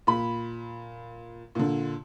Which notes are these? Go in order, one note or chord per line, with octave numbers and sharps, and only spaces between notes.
A#2 B5
A#2 D3